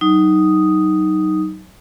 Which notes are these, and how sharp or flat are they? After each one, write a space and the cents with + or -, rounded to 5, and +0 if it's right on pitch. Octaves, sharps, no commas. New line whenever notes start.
F#3 +30 D#4 +0 D#6 +0